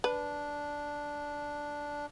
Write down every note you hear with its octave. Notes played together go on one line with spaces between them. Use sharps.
D4 B4